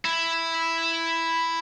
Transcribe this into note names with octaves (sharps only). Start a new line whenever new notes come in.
E4